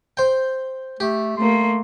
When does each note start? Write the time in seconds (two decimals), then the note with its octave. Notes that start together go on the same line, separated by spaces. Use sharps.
0.17 C5 G5
1.00 A3 G4
1.37 A3 A#3 C6